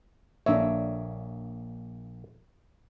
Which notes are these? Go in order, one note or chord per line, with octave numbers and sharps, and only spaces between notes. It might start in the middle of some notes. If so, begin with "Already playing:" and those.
A#1 A#3 D4 C#5 E5